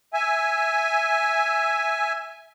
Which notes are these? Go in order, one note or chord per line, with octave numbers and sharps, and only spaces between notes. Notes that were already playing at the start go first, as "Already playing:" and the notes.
E5 G#5